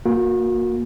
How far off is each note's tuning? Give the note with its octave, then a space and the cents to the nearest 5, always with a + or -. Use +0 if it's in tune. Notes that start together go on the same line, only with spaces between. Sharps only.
A#3 +0 F#4 -35